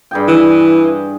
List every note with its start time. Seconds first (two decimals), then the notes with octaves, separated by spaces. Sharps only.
0.11 G2 G#4 G5
0.28 E3